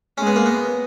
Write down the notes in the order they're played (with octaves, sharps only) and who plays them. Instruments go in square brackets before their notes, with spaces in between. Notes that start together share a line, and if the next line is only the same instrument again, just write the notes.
[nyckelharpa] G#3 [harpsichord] C#4
[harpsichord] B3
A#3
B3